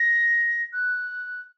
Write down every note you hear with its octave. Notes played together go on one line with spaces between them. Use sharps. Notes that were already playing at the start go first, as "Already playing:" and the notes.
Already playing: A#6
F#6